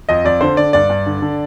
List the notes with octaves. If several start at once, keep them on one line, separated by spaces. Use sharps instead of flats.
F2 D#5
F2 D5
D3 C5
D3 D5
G2 D5
G2
D3
D3